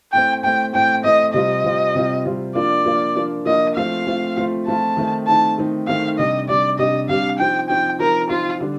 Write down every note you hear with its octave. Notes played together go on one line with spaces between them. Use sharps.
A2 A3 C4 G5
A2 A3 C4 G5
A2 A3 C4 G5
A2 A3 C4 D#5
C3 G3 C4 F4 D#5
C3 G3 C4 F4
C3 G3 C4 F4
C3 G3 C4 F4
F3 A#3 D4 F4 D5
F3 A#3 D4 F4
F3 A#3 D4 F4
F3 A#3 D4 F4 D#5
F3 A3 C4 F4 F5
F3 A3 C4 F4
F3 A3 C4 F4
F3 A3 C4 F4 A5
D#3 A3 C4 D#4
D#3 A3 C4 D#4 A5
D#3 A3 C4 D#4
D#3 A3 C4 D#4 F5
C3 G3 D4 D#5
C3 G3 D4 D5
C3 G3 D4 D#5
C3 G3 D4 F5
F3 C4 D#4 G5
F3 C4 D#4 G5
F3 C4 D#4 A#4
F3 C4 D#4 F4
D3 G3 D4